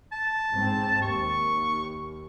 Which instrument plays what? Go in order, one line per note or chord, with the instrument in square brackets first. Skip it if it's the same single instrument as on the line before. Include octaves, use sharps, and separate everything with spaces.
[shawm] A5
[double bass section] G#2 C4
[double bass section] D#2 [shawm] C#6